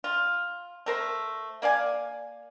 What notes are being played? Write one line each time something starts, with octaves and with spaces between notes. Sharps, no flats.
F4
A3 A#4 C5
A#3 D5 F5 G#5